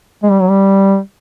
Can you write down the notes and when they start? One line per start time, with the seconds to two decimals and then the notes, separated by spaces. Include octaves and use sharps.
0.23 G#3
0.31 G3
0.41 F#3
0.49 G3